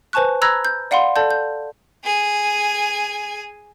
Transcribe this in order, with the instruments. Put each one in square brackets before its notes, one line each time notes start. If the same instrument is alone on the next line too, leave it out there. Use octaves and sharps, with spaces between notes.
[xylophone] B4 C5 G#5 A5 C#6 F#6
A#5 B5 E6 F#6 G#6 A#6
G6
D5 F5 F#5 B5 C6
A4 D5 A5 G6
G6
[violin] G#4 G#5